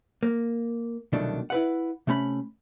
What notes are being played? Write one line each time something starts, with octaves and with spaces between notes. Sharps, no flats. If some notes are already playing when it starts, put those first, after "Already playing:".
A#3
C2 B2 D#3 F#3 A3 D4
E4 B4 F#5
C3 A3 C#4 A#5 B5